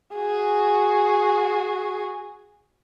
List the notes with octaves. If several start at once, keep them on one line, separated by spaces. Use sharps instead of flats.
F#4 G#4